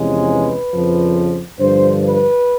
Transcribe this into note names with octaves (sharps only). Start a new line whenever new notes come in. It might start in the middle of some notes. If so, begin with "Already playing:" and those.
Already playing: E2 C3 F3 G#3 C#4
B4
F2 C#3 F3
G2 D3 F3 C5
B4